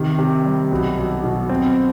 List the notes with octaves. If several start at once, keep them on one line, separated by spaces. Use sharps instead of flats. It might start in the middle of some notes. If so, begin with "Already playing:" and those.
Already playing: C3 D#3
C3
G3
B1
B1
B2
C4